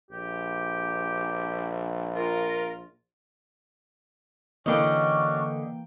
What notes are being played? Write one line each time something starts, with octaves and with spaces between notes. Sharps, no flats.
A#1 G4
F4 A#4
D3 E3 A#3 C#4 D4 F#4 D#5 G5